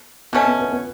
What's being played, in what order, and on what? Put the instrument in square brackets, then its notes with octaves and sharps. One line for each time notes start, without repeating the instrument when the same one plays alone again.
[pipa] B2 A3 C#4 [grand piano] B3
[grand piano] B3
B3
B3